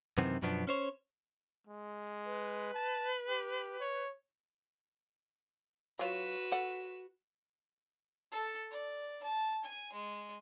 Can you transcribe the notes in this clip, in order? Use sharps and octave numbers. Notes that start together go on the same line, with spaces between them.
F#2 C3 D#3 E3 B3 C4
F#2 B2 F3 B3 D4
C#4 C5 C#5
G#3
B4
A5
G4
C#5
F#3 F4 F#4 B4 E7
A4 F#5
A4
D5
A5
G#5
G#3